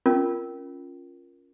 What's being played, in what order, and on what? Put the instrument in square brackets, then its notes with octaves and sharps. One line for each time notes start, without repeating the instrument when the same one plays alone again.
[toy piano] C#4 F4 A#4